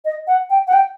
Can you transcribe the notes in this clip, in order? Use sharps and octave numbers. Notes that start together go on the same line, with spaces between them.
D#5
F#5
G5
F#5
G5